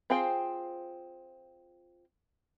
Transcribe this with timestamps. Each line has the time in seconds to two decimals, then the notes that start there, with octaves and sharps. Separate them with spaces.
0.10 C4 F4 G#4 C5 G5